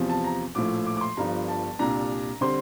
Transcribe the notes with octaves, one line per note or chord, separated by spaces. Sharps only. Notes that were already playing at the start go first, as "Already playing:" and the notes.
Already playing: E2 C3 F3
A5
A#5
A#1 A2 F3 A3 D6
D6
D6
C6
G1 G2 F3 A#5
A5
C2 A#2 G3 D4 A#5
D3 G3 C4 C6